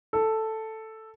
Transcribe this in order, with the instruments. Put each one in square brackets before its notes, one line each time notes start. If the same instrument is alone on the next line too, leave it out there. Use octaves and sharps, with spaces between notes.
[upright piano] A4